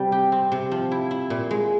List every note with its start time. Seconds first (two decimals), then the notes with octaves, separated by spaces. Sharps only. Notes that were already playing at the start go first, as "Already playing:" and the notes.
Already playing: C3 G3
0.12 G4
0.32 C4
0.52 C3
0.71 F3
0.91 E4
1.11 E4
1.30 A#2
1.51 G#3